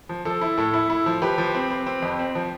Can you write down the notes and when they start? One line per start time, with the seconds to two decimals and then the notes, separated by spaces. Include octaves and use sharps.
0.09 F3
0.25 F3 A4
0.41 E4
0.57 A2 A4
0.74 E4
0.90 E4
1.06 F3
1.22 F3 G4 B4
1.38 F3
1.55 C4
1.70 C4
1.86 C4
2.02 F2
2.19 C4
2.35 F3